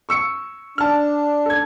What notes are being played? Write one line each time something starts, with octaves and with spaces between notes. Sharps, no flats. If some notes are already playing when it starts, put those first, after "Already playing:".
C#6 E6 C#7
D4 A5 F6
A4 G#6